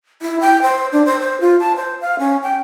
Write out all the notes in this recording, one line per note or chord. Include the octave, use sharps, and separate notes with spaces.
E4
G5
C5
D4
C5
C5
F4
A5
C5
F5
C#4
G5